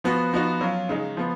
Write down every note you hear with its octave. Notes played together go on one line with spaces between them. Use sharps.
F3 B3 F#4
F3 B3 D#4 F#4
F#3 C#4 F4
C#3 G#3 D#4
F3 B3